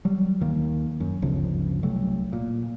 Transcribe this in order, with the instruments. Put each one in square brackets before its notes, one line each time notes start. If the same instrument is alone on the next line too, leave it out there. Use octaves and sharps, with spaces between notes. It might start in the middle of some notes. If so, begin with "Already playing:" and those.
[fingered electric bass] F#3 G3
D#2 D#3 A#3
F#2
G1 D2 C#3 F3
C2 F#3 A3
A#2